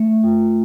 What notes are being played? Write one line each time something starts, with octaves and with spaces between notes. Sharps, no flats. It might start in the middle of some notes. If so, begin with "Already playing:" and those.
Already playing: A3
F4